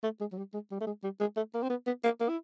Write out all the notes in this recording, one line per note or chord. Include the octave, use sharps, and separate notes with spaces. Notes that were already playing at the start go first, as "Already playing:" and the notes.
A3
G#3
F#3
G3
G#3
G3
A3
G#3
G3
G#3
A3
A#3
C4
B3
B3
A#3
A#3
E4